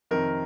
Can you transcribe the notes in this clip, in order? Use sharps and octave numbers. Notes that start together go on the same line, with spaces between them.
F2 C3 D#3 A#4